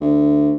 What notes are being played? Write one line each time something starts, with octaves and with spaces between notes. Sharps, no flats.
D2